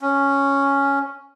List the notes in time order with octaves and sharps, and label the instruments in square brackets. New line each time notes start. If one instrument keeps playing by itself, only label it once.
[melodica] C#4